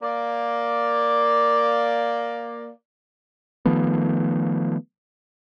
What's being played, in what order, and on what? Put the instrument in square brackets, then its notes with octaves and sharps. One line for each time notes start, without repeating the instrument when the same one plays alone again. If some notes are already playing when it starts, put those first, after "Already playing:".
[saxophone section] A#3 D5
[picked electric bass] D#3 F3 A3 B3